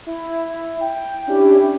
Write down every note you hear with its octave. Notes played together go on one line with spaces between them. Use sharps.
E4
G5
C#4 D4 E4 G4